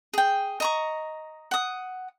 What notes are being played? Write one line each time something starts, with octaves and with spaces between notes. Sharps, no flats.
G#4 G5
D#5 A#5 C#6
F#5 D#6